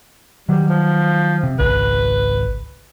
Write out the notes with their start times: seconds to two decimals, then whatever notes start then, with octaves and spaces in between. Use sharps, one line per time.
0.49 D#3 F#3 G3
0.68 F3
1.43 C3
1.59 G#1 C#2 B4